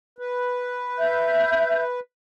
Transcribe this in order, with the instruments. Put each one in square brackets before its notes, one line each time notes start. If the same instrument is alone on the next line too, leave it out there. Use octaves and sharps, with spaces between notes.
[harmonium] B4
[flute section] E5 G6